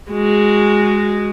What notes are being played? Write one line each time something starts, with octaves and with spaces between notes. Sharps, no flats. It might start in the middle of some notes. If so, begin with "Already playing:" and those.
G#3 F#4